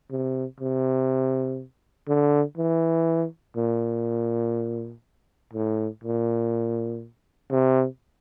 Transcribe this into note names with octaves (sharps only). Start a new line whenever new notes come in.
C3
C3
D3
E3
A#2
A2
A#2
C3